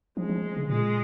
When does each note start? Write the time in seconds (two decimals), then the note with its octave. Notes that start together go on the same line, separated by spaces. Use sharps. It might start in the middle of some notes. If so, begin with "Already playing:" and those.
0.17 F3 G#3
0.29 F3
0.57 C#3
0.69 A#2 G#3